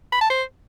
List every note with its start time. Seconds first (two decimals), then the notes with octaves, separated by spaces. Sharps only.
0.12 B5
0.21 A5
0.30 C5